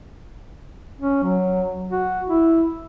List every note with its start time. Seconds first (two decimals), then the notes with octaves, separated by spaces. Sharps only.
1.01 C#4
1.23 F#3
1.91 F#4
2.28 E4